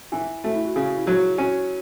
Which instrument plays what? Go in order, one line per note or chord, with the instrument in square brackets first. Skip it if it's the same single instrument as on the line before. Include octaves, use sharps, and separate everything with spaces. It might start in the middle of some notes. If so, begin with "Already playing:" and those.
[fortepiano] E3 [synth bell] E4
[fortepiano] A3 [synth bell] F#4
[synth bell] E4
F#4
[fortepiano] C#3 [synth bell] G#4
[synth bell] E4
[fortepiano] F#3 [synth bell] F#4
[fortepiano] C#4 [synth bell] F#4